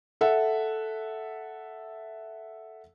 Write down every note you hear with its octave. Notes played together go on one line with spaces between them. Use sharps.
A4 E5 F#5